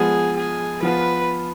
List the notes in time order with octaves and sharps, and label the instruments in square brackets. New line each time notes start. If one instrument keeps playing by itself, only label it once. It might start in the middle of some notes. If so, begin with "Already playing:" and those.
Already playing: [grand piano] F3 G#3 B3 [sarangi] G#4
[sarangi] G#4
[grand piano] F3 B3 F4 [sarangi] B4